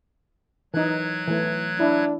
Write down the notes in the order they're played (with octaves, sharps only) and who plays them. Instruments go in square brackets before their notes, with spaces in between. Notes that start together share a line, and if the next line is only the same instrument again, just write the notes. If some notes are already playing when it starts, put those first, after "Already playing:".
[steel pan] E3 D#4 [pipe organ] F#3 F#6 G#6
[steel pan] E3 A3
[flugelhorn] D4 [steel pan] E4